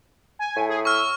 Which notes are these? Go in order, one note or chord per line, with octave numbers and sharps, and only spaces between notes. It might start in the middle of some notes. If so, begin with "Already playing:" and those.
G#5
A2
G#4
C#6 E6 F6